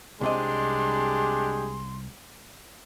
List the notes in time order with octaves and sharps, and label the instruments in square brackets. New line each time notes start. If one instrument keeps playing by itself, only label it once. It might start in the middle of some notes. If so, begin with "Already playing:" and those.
[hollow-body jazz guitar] C2 C4 D#5 [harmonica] G#3 D4 G4 [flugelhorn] G#4 [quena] C6